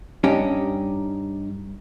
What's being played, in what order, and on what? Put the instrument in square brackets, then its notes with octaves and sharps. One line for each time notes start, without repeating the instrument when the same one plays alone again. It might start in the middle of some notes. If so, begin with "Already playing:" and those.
[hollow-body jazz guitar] G2 C#4 D#4 G4